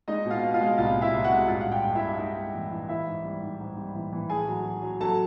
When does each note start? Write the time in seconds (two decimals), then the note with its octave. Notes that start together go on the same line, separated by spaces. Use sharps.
0.08 G#3 D#4 D#5
0.25 B2
0.30 F4 F5
0.43 B2
0.54 F4 F5
0.61 G#3
0.77 C2 F4 F5
0.95 C2
1.01 E4 E5
1.14 C2
1.24 F#4 F#5
1.31 G#3
1.48 G2 F4 F5
1.61 F#5
1.66 G2
1.72 G4 G5
1.84 G2
1.95 E4 E5
2.01 G2
2.19 G#3 D#4 D#5
2.37 G#3
2.54 E3
2.71 E3
2.89 E3 E4 E5
3.06 G#2
3.24 G3
3.42 G#2
3.60 G#2
3.77 G3
3.95 E3
4.13 E3
4.30 A2 G#4 G#5
4.48 F#3
4.65 F#3
4.82 F#3
5.00 F#3 A4 A5